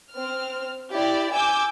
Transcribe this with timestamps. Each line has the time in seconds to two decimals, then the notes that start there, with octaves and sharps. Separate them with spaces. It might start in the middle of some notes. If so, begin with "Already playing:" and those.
0.12 C4 F6
0.92 E4 G4 D5
1.32 G#5 D6 E6 G6